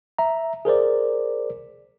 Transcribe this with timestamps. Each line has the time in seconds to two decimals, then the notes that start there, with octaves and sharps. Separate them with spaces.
0.18 E5 A#5
0.65 G#4 A#4 C5 D5